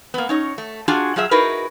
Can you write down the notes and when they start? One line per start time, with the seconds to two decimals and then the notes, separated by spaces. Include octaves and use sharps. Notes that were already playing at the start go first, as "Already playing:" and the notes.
0.14 A#3 B3
0.29 C#4 D#4 C#5
0.58 A3
0.88 D4 F4 F#4 G#4 G#5
1.16 F#3 F4 G#4 E5
1.31 D#4 E4 F#4 G#4 A#4 B4